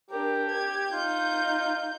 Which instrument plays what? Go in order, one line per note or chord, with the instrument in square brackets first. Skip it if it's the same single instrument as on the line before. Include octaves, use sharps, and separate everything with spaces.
[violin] D4 A#4 [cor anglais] G4
[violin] G#6
[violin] D#4 G6 [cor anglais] F4